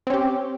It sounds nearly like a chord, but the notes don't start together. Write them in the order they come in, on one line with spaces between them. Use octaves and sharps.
C4 C#4 G4